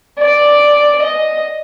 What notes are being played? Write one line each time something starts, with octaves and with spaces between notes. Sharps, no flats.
D5
D#5